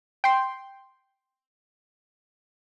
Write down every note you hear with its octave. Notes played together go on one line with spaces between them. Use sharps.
G5 C6